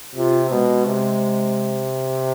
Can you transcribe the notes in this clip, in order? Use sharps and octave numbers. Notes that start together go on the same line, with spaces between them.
C3 F4
B2 G#3
C3